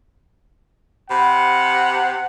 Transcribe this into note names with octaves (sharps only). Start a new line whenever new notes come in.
C3 F#5 B5